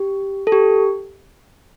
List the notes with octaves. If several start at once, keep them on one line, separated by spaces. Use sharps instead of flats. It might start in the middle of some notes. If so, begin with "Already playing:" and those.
Already playing: G4
A4
G4